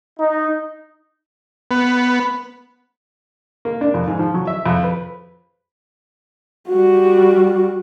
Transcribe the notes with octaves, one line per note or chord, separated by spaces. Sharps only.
D#4
B3
A#3
D4
F2
G#2
F3
F#3
E5
F2
B4
G3 F#4